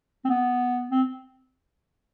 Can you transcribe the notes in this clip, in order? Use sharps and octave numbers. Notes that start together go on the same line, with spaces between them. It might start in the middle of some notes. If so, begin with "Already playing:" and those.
C4
B3
C4